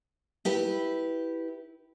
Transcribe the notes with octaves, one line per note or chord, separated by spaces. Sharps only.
E4 G4 B4